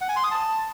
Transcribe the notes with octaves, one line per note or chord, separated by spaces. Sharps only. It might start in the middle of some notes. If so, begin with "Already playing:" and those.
F#5
G#5
C6
D#6
A5